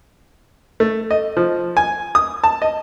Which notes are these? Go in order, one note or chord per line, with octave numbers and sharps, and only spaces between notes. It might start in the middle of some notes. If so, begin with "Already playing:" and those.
A3
D#5
F3
G#5
D#6
A5
D#5